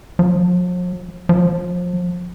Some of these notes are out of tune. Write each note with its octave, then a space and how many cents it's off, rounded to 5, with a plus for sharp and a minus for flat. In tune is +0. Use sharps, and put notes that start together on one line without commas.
F3 +45
F3 +30